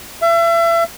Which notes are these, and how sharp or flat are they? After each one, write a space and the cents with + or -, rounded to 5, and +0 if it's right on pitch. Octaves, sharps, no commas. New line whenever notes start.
E5 +35